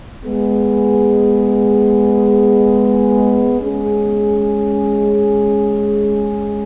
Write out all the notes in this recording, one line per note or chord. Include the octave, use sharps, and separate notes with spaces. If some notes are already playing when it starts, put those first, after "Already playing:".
G#3 B3 G#4
G#3 C#4 G#4